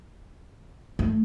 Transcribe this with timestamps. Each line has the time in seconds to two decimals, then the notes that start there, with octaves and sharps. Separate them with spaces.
0.99 A3